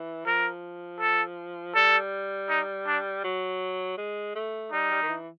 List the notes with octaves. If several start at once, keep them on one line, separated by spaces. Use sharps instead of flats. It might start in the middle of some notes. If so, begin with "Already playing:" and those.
Already playing: E3
F3 A#4
A4
G3 A4
D#4
D4
F#3
G#3
A3
G3 D#4
G3
D#3
E3